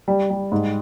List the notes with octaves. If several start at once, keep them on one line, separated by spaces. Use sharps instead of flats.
G3
G3
G#2